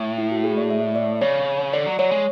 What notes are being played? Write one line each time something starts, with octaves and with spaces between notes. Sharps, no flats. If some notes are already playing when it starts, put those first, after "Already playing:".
Already playing: A2
E4
F#4
G#4
D5
E5
D5
C#3 C#5
D3 D5
F#3
F#3 C#5
G#3